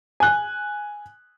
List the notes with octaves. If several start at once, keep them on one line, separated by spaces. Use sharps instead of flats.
G#5 F#6